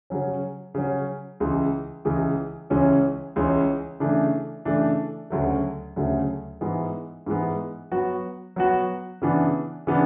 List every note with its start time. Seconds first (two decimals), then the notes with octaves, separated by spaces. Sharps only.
0.10 C#3 F#3 C#4
0.75 C#3 F#3 C#4
1.40 C#2 C#3 E3
2.05 C#2 C#3 E3
2.70 C#2 C#3 E3 G#3 C#4
3.36 C#2 C#3 E3 G#3 C#4
4.00 C#3 E3 A3 D4
4.65 C#3 E3 A3 D4
5.30 D2 C#3 F#3 A3
5.96 D2 C#3 F#3 A3
6.61 G#2 E3 G#3 B3
7.26 G#2 E3 G#3 B3
7.92 F#3 B3 F#4
8.56 F#3 B3 F#4
9.22 C#3 E3 B3 D4
9.87 C#3 E3 B3 D4